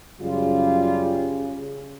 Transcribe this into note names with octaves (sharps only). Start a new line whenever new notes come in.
F#2 C#3 G3 F4